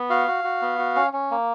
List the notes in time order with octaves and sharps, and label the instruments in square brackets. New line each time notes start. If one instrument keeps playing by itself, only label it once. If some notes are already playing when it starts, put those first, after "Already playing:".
Already playing: [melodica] B3
F#4 F5
F#4
F#4
B3
F#4
C#4
C#4
A#3